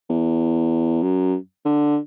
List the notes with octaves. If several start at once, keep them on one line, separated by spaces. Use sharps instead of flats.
E2
F#2
D3